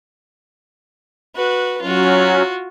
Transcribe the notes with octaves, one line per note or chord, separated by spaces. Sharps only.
F#4 B4
F#3 C#4 F4 F#4